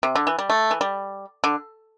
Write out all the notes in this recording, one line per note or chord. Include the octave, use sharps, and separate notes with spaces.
C3
D3
E3
G3
A3
E3
G3
D3